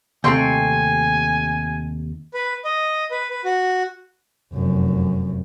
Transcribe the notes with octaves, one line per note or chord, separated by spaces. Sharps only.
D#2 C3 A3 G5 G#5 C6 C#6
B4
D#5
B4
B4
F#4
F1 F#2